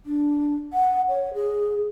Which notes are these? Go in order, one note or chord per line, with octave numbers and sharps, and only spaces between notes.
D4
F#5
C#5
G#4